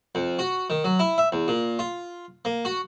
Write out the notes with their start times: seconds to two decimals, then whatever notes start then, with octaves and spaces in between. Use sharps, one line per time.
0.15 F2
0.39 F#4
0.70 D#3
0.84 F#3
0.99 E4
1.18 E5
1.32 E2
1.48 A#2
1.79 F4
2.45 A#3
2.65 F#4